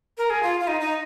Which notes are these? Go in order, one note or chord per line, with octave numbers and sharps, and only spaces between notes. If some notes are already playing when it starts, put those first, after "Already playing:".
A#4
G#4
F4
F4
D#4
D#4